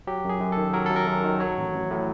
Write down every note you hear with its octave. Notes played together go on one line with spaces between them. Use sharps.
F#3 G4
F#2 G#4
F#2
D#3 A4
F#3 A#4
A4
F#2
A#4
F#2
D#3
F#3 C#5
A1
A1
A2